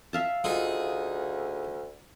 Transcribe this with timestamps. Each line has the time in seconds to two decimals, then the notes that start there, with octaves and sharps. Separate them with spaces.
0.13 E5 F5 A5
0.44 D2 D#4 F4 G#4